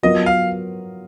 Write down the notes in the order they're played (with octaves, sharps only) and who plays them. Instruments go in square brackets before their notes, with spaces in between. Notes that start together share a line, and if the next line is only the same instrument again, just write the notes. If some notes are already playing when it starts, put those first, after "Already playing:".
[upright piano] F#3 B3 F4 A#4 [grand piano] D#5
[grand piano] F5